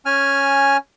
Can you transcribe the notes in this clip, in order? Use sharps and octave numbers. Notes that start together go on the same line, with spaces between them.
C#4 G#5 F6